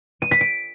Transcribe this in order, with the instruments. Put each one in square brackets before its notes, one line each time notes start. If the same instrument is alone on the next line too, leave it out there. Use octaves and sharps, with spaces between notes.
[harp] D#7
B6
D7